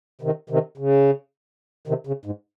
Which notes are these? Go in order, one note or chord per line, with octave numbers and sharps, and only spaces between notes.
C3 D#3
C3 D#3
C#3
C3 D#3
C#3
G#2